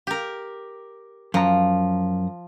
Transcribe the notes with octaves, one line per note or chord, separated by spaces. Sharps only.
G4 A#4
F#2 F3 A#5